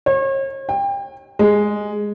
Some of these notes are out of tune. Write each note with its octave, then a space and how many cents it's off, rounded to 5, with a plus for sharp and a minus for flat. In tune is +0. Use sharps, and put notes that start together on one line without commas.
C#5 -40
G5 +25
G#3 -5